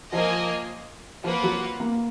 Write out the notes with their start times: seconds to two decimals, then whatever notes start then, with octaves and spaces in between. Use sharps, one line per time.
0.12 F3 A#3 F4 A#4 D#5 G#5
1.24 F3 A#3 F4 B4 F#5
1.43 F#3
1.80 A#3